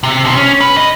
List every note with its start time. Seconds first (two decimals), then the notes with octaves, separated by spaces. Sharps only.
0.03 C3
0.25 B2 C4
0.36 C#4
0.61 B4
0.77 D#5